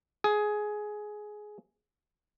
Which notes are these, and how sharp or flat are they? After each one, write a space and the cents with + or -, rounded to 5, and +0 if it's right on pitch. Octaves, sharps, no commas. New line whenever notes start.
G#4 +15